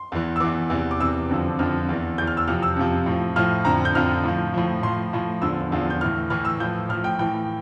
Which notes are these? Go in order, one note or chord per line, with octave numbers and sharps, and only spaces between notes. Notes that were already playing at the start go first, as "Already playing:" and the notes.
Already playing: C6
E2 E3
E6
E2 E3 D6
E2 C3 E3
D6
E2 C3 E3 E6
F2 D3 F3
F2 D3 F3 F6
E2 E3
E2 E3 G6
F6
E6
F2 C3 F3 F6
E6
F2 C3 F3
A2 F3
A2 F3 F6
F2 D3 F3 A#5
G6
F2 D3 F3 F6
A2 F3
A2 F3
A2 F3 C6
A2 F3
E2 D3 F3 E6
E2 D3 F3
G6
A2 E3 F6
A2 E3 F6
E6
A2 F3 G6
A2 F3 F6
G5
A2 E3 G5